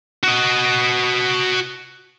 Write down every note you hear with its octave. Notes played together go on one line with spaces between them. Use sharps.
F#4 D#5